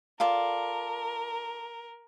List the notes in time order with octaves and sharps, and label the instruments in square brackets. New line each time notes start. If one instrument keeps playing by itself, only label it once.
[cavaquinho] F4 A4 D5 [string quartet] A#4